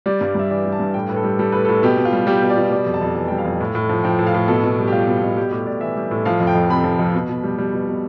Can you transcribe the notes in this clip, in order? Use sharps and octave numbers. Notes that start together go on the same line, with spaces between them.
G3 D5
G2
G2 E5
E3 D5
G3
A5
G2
A2 G5
A2 B4
A4
G3
G3 A4
A2 B4
A2 A4
B2 G4
B2
F4
G3
G3 G4
B2
D5
B2
G3 D5
F2
A5
F2
E3 A5
G3 G5
F5
F2
A2
A2
F3
F3 G5
A2
F5
A2
B2 A4
B2
G3
G4
G3 F4
B2
B2
G3 G4
A2 G4
A2 D5
E3 E5
G3
A2
F3 F5
F2
G5
F2
C3 B5
F3
F2
B2
B2
G3
G3
B2
B2